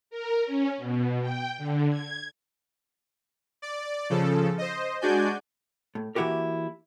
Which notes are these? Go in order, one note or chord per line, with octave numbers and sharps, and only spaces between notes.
A#4
C#4
B2
G5
D3
G#6
D5
C#3 F3 A4
C5 D#5
G#3 D4 F#4 D5 G#5 G6
A2
E3 A#3 E4 F#4 G4 A#4